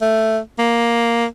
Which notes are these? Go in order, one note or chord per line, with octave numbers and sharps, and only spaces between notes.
A3
A#3